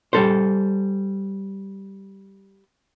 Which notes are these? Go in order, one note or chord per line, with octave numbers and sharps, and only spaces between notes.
G3 A4 C5